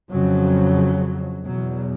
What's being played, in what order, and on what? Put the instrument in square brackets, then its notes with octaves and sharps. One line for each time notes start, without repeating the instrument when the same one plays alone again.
[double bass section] F2 C#3 F#3
E2 B2 F#3